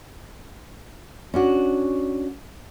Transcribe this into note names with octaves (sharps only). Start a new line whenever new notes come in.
C#4 D4 F#4